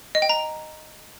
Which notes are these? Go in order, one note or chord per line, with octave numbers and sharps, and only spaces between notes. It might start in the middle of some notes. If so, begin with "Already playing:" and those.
D#5
G5
A#5